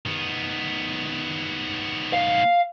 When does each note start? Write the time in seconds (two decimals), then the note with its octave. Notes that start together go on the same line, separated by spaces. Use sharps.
0.06 D#3 B3
2.13 F5